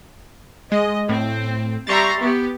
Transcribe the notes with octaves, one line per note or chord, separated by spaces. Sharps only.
G#3 D#5
A2 C4
G3 E5 A#5 C6 C#6 A6
B3 G4